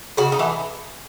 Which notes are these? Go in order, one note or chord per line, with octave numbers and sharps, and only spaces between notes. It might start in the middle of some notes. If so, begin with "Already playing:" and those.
C#3 F#4
D#4
E3 A3